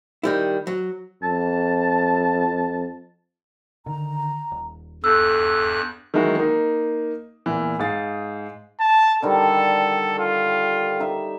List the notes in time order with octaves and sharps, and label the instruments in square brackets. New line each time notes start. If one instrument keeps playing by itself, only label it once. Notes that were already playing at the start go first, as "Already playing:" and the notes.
[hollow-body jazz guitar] D#3 G3 E4
F#3
[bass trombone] F2 [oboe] A5
[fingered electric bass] D3 D#3 [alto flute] A#5
[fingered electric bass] D#1
[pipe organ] E2 G2 F#6 [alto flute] A4 [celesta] E6
[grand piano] D#3 E3 F#3 G#3 E4 F#4
A#3 D#4
E2 A#2 E3
G#2 G#4 F5 A6
[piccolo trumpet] A5
[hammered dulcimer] D3 D#3 G3 [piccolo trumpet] A4
[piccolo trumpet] F4
[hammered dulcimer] D#4 E5